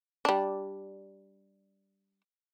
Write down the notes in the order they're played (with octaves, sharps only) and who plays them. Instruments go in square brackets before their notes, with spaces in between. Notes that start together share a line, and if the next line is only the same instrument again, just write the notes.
[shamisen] G3 D4